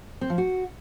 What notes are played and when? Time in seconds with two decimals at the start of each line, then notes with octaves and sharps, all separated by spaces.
0.21 C4
0.30 F3
0.38 F#4